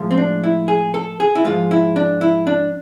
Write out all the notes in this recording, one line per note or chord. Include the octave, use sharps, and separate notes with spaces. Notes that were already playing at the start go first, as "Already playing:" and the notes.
Already playing: A2 F3 G#3
C4
D4
E4
G#4
A4
G#4
E4
G#2 F3 G#3 F4
E4
D4
E4
D4